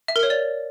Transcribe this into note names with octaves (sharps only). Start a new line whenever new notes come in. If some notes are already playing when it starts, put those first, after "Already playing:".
E5
A#4
C#5
D5